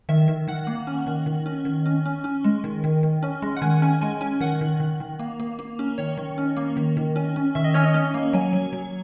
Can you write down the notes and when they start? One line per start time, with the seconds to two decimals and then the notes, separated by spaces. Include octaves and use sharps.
0.09 D#3 E5
0.28 D#3
0.48 D#3 F#5
0.67 A#3
0.87 C#4
1.07 D#3
1.26 D#3
1.46 C#4
1.65 D#3
1.86 C#4
2.06 C#4
2.24 C#4
2.44 G#3
2.64 D#3
2.84 D#3
3.03 D#3
3.23 C#4
3.42 G#3
3.57 F#5
3.62 D#3 G#5
3.82 C#4 G#5
4.01 G#3 G#5
4.21 C#4 G#5
4.40 D#3 F#5
4.61 D#3
4.80 D#3
5.00 D#3
5.19 A#3
5.40 A#3
5.59 A#3
5.79 C#4
5.98 D#3 C#5
6.17 D#3
6.38 C#4
6.57 A#3
6.77 D#3
6.97 D#3
7.16 C#4
7.36 C#4
7.55 D#3 E5
7.64 D#5
7.74 C#4 C#5
7.84 D#5
7.94 C#4
8.14 A#3
8.33 F#3 G#5
8.53 F#3
8.73 F#3